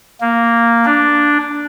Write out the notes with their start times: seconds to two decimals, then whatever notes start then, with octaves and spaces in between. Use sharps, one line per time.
0.21 A#3
0.85 D4